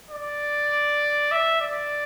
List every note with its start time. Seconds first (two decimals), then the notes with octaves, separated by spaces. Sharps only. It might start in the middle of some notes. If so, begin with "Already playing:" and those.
0.11 D5
1.32 E5
1.61 D5